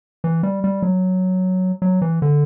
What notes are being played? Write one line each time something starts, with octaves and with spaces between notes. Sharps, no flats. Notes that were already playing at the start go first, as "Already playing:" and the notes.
E3
G3
G3
F#3
F#3
E3
D3